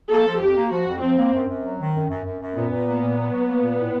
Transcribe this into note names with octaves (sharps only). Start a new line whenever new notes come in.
A#3 A4
F3
F2 G4
A#3
F3 F#4
F2
F3 C4
A#3
F#2
F#2
F#3
D#3
F#2
F#2
F#2
F#2
A#2 B3
A#2
A#3
A#2
F#3
F#3
A#3
A#2
A2